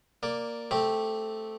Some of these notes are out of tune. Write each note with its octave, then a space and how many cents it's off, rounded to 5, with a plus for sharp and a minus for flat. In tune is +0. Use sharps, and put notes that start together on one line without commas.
A#3 +0 D5 +0
A3 +0 C4 -5 G4 +0